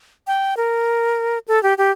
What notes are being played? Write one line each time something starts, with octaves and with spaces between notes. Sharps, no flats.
G5
A#4
A4
G4
G4